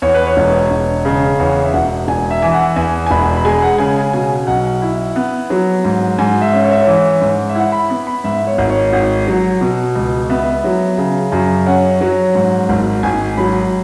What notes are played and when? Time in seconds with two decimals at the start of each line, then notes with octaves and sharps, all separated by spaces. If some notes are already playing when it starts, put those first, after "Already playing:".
0.02 E2 C#5
0.14 B4
0.27 C#5
0.37 E1
0.71 E1
1.05 C#3
1.39 E2 C#5
1.64 E5
1.74 E1 F#5
2.08 E1 G#5
2.31 E5
2.42 E3 G#5
2.53 F#5
2.76 E2 G#5
3.06 G#5
3.11 E1 B5
3.36 B5
3.45 G#3 G#5
3.62 F#5
3.78 C#3 G#5
3.96 G#5
4.13 B2 G#5
4.47 B1 F#5
4.82 E4
5.16 B3
5.50 F#3
5.84 G#2
6.18 G#2 G#5
6.41 E5
6.53 C#4
6.64 C#5
6.72 E5
6.79 C#5
6.87 E3
7.21 G#2
7.49 E5
7.55 E4 F#5
7.72 B5
7.90 B3
8.07 B5
8.24 G#2 E5
8.47 C#5
8.58 G#1
8.70 C#5
8.93 G#1
9.27 F#3
9.61 B2
9.95 C#2
10.29 B3 E5
10.64 F#3
10.98 C#3
11.32 F#2
11.66 C#4 F#5
12.01 F#3
12.35 G#2
12.69 G#1
13.03 G#1 G#5
13.37 F#3 B5